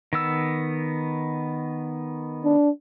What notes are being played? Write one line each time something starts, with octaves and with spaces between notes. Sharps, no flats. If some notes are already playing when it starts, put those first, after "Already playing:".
D#3 B3 E6
D4